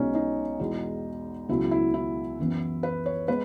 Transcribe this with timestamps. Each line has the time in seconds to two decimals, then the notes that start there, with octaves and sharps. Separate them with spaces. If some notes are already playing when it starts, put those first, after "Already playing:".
Already playing: B1 B2 G#3 B3 C#4 D#4
0.15 D#4
0.59 E2 B2 G#3
1.49 C#2 B2 F#3 E4
1.71 E4
1.94 E4
2.39 F#2 E3 B3
2.83 B4
3.06 C#5
3.28 G#3 B3 B4